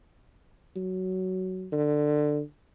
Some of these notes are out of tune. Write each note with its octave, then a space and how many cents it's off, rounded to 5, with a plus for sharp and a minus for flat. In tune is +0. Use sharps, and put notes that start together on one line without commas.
F#3 +10
D3 +15